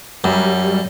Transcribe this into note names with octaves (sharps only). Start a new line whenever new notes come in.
F#2 F#3 G3